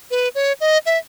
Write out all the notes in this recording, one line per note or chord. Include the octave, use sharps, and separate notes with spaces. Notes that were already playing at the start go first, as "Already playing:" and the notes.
B4
C#5
D#5
E5